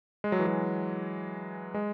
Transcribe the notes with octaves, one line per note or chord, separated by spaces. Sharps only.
G#3
F#3
E3
F#3
G#3